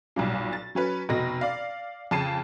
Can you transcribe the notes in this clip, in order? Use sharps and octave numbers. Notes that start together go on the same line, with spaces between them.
B1 G2 A#2
A6
F#3 C#4 B4
F1 B2 D#5 A#6
D5 F5
F2 C#3 A5 C7 D#7